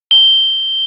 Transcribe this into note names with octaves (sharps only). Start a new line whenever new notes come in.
G7